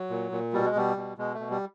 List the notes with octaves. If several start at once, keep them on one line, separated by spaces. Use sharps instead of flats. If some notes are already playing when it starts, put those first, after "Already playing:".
Already playing: F#3
A#2
A#2
B2 G3
G#3
B2 G3
B2
B2 G#3
A3
B2
G3